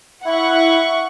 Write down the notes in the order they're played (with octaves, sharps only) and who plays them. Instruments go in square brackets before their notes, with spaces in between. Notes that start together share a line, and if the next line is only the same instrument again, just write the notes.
[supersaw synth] E4 [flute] E5 [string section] F#5 C#6